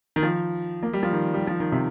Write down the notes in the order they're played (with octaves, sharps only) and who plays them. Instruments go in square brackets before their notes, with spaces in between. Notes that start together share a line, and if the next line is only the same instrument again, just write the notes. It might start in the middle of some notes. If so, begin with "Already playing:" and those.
[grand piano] D#3
F3
A#3
G3
F3
D#3
G3
F3
D#3
C3